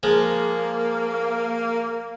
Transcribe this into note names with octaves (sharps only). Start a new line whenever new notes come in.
F3 G#3 A#3